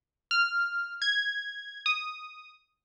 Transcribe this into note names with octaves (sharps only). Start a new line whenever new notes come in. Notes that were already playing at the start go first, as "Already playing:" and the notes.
F6
G#6
D#6